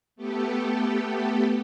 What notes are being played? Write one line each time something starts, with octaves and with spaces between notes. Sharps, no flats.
A3 B3 G4 A4